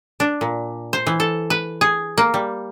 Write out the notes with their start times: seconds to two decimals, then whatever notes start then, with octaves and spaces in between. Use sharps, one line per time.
0.20 D4
0.41 A#2
0.93 C5
1.07 E3
1.20 A4
1.50 B4
1.81 G#4
2.18 A#3
2.34 G3